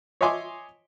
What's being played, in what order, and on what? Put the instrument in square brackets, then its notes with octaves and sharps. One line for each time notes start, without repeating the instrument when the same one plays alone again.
[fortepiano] C#5 D#5 E5 G#5 C6 D6